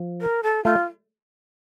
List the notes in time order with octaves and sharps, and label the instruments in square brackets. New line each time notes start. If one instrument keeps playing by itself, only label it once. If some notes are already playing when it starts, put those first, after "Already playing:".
Already playing: [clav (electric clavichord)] F3
[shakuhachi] A#4
A4
[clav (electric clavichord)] A3 [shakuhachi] F4